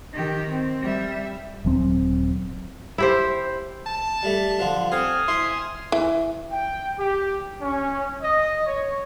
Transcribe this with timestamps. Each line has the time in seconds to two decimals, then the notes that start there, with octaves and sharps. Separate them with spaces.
0.13 D#3 G4
0.51 C4
0.81 G3 E5
1.65 D#1 F#3 C4
2.98 E4 G4 C5
3.86 A5
4.23 G3 A3
4.59 D3 F3
4.92 C4 A4 G#5 D#6 F6
5.28 E4 C6
5.92 E3
6.52 G5
6.98 G4
7.61 C#4
8.21 D#5
8.65 C#5